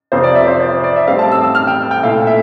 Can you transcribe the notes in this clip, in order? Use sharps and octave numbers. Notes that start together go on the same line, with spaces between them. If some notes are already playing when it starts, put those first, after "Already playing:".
F2 C3 F3 C5
D5
E5
C5
C5
D5
E5
A2 G3 C4 F5
A5
E6
E6
F6
G5
G5
A#2 A3 E4 F5
E5